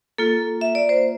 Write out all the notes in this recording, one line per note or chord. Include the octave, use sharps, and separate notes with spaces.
A#3 F4 A4
E5
D5
C5